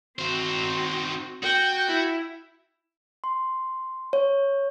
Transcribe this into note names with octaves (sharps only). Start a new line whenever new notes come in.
D#3 C4 F#4 C5
F#4 G5
E4
C6
C#5